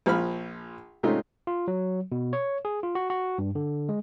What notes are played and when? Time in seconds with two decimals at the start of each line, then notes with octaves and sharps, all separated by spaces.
0.06 A#1 F3 B5 F6
1.03 G#2 C3 A3 C#4 D#4 F4
1.47 F4
1.68 F#3
2.12 B2
2.33 C#5
2.65 G#4
2.83 F4
2.95 F#4
3.10 F#4
3.38 G2
3.55 D3
3.89 G#3